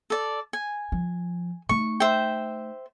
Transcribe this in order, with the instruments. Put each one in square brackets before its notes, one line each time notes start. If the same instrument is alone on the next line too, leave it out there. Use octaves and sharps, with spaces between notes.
[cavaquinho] A4 D5
G#5
[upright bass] F3
[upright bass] A3 D#4 [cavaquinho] C#6
[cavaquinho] C5 E5 G5